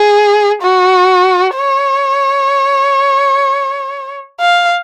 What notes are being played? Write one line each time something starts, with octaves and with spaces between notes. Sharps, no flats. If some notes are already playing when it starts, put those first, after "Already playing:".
Already playing: G#4
F#4
C#5
F5